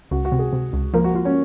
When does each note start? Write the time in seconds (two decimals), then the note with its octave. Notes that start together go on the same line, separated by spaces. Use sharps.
0.11 C#2 F#4
0.25 F#4
0.32 C3
0.39 G#4
0.53 C3
0.73 C#2
0.94 F3 A#3 A#4
1.04 F#4
1.14 F4 F#4
1.25 C#4 C#5